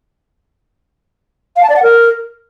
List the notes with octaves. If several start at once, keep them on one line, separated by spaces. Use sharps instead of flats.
F5
A5
D5
F#5
A#4